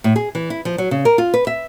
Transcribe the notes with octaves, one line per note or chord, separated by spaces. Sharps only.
A2
G#4
E3
E4
F3
F#3
C#3
A#4
F4
B4
E5